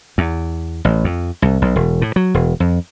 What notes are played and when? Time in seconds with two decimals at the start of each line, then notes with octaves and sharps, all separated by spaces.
0.18 E2
0.85 A1
1.04 F2
1.42 C2
1.62 B1
1.76 E1
2.02 A2
2.16 F#3
2.34 E1
2.60 F2